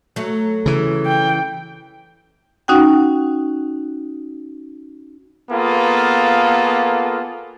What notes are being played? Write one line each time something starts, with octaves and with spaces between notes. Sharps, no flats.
F#3 A3
C#3 E3
G5
C#4 D#4 F#4 F#5 G5
A#3 B3 F4 G#4 A4